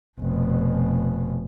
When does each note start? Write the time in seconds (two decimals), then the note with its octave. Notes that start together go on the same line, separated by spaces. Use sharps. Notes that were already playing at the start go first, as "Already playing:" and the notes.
0.20 F1 B2